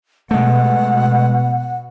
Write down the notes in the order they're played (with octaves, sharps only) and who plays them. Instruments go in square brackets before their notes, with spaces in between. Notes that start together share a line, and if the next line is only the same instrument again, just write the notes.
[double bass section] B2 [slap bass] G#3 A3 [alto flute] F#5